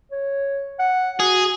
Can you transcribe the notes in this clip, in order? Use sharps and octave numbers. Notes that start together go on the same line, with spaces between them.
C#5
F#5
F#4 G#4